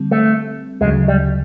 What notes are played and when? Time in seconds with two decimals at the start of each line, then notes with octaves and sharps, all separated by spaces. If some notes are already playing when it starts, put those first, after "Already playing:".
Already playing: D3 G3 C4
0.11 A3
0.81 D2 C#3 F#3 G#3
1.08 G3